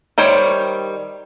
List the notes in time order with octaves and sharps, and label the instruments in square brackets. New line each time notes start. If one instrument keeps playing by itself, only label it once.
[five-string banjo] D#3 G3 C5 C#5